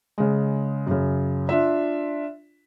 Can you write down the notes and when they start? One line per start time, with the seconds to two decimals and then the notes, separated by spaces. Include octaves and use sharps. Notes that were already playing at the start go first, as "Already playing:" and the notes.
0.18 C#3 G#3
0.87 F#2 C#3
1.49 D4 F4 E5